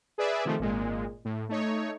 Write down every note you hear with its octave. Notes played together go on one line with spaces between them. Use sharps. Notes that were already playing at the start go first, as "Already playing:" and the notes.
G#4 B4 D5 E5
C3 D#3 F3 A3
G#1 A#2 G#3
A2
A3 D#4 C#5